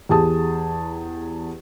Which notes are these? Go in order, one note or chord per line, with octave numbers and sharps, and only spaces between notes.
E2 G4 G#4 A5 D#6